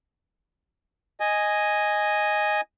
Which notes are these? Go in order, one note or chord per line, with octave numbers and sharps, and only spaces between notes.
D#5 G#5